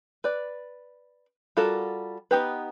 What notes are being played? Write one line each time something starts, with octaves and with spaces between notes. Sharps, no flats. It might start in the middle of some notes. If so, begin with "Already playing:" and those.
B4 D5
G3 F4 F#4 A4 A#4
B3 D#4 G4 B4